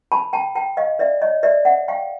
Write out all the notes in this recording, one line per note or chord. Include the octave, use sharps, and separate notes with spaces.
A5 B5
G5 A5
G5 A5
D#5 F5
D5 E5
C#5 D#5
D5 E5
E5 F#5
F5 G5